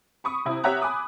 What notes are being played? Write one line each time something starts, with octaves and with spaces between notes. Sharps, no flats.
B5 C#6 D#6
C3 E4
G4 C#5 E5 F#5 A#5 F#6
G#5 B5 D6 D#6